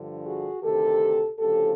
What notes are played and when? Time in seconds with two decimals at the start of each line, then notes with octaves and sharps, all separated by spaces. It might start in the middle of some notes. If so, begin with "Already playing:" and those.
Already playing: G2 D3 F3
0.25 F#4 G#4
0.62 D2 C3 D#3 G4 A4
1.38 D2 C#3 F3 G4 A4